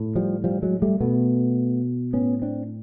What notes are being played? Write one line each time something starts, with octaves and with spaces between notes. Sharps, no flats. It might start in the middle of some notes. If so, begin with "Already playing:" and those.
Already playing: A2
F3 G3
F3 G3
F#3 G#3
G3 A3
B2 A3 B3
A2 B3 C#4
C4 D4